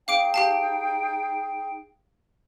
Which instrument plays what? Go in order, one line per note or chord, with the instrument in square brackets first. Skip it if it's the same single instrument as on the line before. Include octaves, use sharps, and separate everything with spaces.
[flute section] D#4 G#4 G5 [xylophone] F5 D6 D7
[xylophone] G4 F5 A5